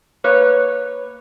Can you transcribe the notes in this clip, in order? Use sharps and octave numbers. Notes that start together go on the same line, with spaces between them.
A#3 B4 C#5